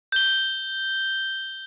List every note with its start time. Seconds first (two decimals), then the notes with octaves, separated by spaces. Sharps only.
0.12 G6 G7